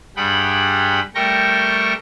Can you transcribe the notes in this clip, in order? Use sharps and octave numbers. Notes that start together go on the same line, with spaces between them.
G2 G3 G#4 F#5 G5 B5
G3 A3 A#4 G5 C#6 A#6